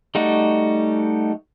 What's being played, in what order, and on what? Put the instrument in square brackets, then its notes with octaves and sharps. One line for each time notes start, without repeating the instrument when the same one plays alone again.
[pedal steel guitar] G3 A3 D#4 F#4